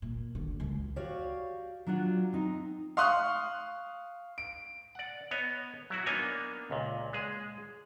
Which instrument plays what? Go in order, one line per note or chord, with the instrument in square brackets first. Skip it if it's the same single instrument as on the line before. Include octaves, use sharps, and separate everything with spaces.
[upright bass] A#2
D3
C#2
[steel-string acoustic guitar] F#4 G4 C#5 D5 F5
F#3 D4 F4 F#5
C4 D#4
[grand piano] F5 C6 C#6 D#6 F#6
D7
[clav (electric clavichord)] D5 F#5
B3 C#5 D#5
F#3 E4 F#4
A#3 B3 D4 D#4 C#5 G#5
C#2 A#2
G#3 G#4